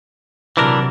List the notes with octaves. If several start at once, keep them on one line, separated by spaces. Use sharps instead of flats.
C3 E3 F#3 D4 A#4